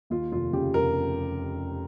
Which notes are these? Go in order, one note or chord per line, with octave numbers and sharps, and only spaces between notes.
D#2 F4
F1 F4
C#3 G4
F1 A#4